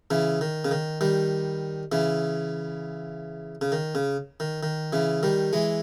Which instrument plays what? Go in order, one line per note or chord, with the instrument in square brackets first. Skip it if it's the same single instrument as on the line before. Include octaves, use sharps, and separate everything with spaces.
[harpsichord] C#3 E3
D#3
C#3
D#3
D#3 G3
C#3 E3
C#3
D#3
C#3
D#3
D#3
C#3 E3
D#3 G3
E3 G#3